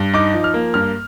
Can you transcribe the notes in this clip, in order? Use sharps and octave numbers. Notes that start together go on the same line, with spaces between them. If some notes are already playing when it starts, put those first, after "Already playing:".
Already playing: G2
D#4 D6
F3
F6
A#3
G2 F6